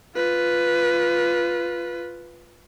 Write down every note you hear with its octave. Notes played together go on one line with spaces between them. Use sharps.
F4 B4